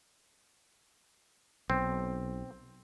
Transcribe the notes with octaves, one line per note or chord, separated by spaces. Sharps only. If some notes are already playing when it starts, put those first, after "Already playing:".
B1 C4